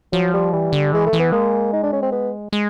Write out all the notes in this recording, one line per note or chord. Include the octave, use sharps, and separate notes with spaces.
F3 F#3
G3
E3 G3
D3
E3 G#3
A3
E3
B3
G#3 A#3
D#4
D4
C#4
C4
B3
G#3